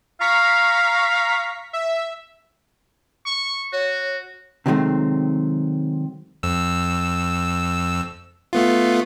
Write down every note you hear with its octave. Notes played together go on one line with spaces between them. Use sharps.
F5 A#5 C#6 B6
E5
C#6
F#4 C#5
C3 D#3 F#3 G#3 A3 C4
F2 E6
A3 B3 F4